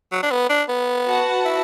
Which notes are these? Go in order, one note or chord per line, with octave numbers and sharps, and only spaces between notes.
F#3
D4
B3
D4
B3
F#4 B4 F#5 A5
E4